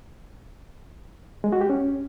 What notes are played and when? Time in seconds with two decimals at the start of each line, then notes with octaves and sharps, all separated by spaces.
1.44 G#3
1.52 F#4
1.61 G4
1.70 C#4